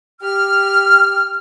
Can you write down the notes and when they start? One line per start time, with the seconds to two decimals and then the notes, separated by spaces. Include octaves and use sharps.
0.21 G4 F6